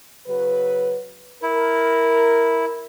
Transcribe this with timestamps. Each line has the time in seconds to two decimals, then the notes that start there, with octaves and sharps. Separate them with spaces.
0.27 C#3 F#3 B4
1.42 E4 A#4